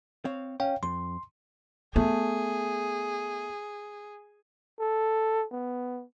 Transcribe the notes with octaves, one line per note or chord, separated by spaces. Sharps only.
C4 C#5 F5
C#4 C#5 F5 G5
F2 C6
A3 B3 G#4
A4
B3